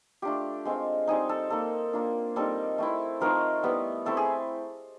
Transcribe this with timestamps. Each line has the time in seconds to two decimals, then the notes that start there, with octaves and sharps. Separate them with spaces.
0.22 A3 D4 F4 G4
0.65 G#3 C4 F4
1.07 G3 C4 D#4 G#4
1.29 A4
1.50 A#3 D#4 A4
1.93 A#3 D4 F4
2.36 G3 C4 D#4 A4
2.78 A3 C4 E4
3.21 F3 A3 C4 D#4 A#4
3.63 G3 B3 E4
4.06 A3 C4 E4 A4
4.17 G#4